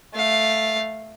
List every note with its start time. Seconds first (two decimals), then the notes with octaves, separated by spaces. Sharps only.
0.14 A3 F5